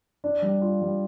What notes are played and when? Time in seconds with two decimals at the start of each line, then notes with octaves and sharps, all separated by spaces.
0.24 D4
0.42 G3
0.62 F4
0.82 G3